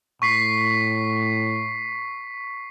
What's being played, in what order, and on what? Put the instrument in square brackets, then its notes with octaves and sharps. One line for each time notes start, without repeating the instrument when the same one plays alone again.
[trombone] A2 [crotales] C#6 B6 C7